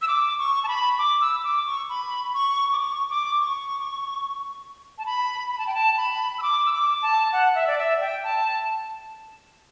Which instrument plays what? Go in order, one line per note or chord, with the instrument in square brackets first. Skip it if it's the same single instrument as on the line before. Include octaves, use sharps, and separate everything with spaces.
[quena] E6
D6
C#6
A5
B5
D6
E6
D6
C#6
B5
C#6
D6
C#6
D6
C#6
A5
B5
B5
A5
G5
A5
B5
E6
D6
E6
D6
A5
F#5
E5
D5
E5
G5
A5